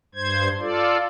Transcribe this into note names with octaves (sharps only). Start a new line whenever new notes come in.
G2 C5 G#6
F4 A4 D5